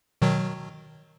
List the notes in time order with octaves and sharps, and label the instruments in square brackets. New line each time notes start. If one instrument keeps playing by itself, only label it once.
[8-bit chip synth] B2 D#3 F#3